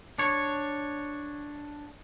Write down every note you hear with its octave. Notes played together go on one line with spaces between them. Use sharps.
D4 C#5